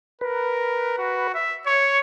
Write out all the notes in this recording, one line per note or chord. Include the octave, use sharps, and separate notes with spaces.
A#4 B4
F#4
E5
C#5 C#6